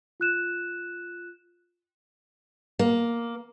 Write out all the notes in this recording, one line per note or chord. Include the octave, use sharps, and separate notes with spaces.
F4 F#6 E7
A#3